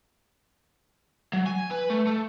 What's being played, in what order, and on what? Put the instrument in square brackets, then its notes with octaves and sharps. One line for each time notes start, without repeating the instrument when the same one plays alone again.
[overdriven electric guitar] F#3
G#5
B4
A3
A3